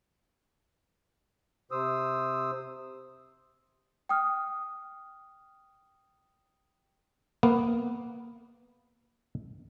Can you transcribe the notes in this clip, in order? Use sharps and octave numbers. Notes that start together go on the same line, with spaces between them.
C3 C5 D#6 E6
G5 D#6 F6
A#3 B3